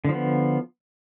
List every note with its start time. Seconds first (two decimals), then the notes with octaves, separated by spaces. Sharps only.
0.05 D3
0.09 F3
0.13 B3